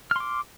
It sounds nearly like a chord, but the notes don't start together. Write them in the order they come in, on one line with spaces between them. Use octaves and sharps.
F6 C6 D6